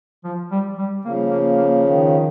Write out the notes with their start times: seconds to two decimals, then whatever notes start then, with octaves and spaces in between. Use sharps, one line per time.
0.24 F3
0.51 G3
0.78 G3
1.05 C#3 F3 A#3
1.31 A#3
1.58 A#3
1.84 D#3